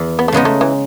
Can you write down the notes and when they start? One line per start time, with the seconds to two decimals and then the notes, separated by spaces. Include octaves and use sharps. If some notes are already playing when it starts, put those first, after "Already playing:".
Already playing: E2
0.19 B3
0.28 A3
0.32 C#3 G#3 B3 D#4
0.45 A3
0.61 E3